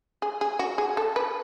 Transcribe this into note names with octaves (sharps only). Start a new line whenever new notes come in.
G#4
G#4
F#4
G#4
A4
B4